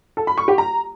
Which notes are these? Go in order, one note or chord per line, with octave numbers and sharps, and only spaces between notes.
A4
B5
C#6
G4
A#5